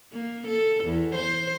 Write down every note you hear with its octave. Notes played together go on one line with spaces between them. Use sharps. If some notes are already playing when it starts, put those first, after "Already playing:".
A#3
A4
E2
C5